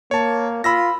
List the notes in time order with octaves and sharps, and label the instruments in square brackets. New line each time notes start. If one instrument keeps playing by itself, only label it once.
[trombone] A#3 [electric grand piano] C#5 A5
[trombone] F4 [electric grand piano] B5 E6 A#6